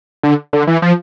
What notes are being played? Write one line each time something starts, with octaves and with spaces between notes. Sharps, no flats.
D3
D3
E3
F3